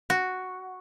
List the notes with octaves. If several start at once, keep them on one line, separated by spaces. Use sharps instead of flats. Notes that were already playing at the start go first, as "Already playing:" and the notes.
F#4